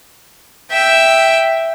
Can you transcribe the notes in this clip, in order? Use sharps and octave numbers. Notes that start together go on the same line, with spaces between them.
E5 G5